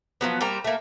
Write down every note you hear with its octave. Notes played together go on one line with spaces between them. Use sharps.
F3 F#3 B3
G3 A#3 C5 A#5
A3 A#3